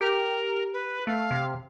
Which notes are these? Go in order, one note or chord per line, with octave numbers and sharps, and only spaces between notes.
G4 A#4
B4
A3 F5
C3